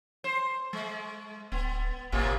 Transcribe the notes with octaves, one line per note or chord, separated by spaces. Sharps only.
C5
G#3
D1 B3
G#1 A2 C3 A#3